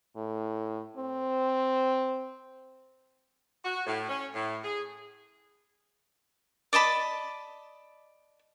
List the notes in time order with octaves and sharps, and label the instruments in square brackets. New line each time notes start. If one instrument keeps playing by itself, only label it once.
[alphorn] A2
C4
[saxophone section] F#4
A2
C#4
A2
G#4
[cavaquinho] D5 D#5 A5 B5